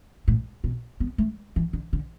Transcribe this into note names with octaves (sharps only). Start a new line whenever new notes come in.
A2
B2
B3
A3
E3
D3
D3